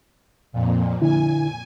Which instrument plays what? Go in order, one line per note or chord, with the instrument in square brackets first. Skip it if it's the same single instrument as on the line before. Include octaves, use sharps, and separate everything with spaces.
[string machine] F2 A#2
[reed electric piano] D3 E4 [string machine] G#5